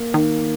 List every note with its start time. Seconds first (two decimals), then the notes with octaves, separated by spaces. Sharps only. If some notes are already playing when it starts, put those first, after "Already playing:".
Already playing: A#3
0.14 D#3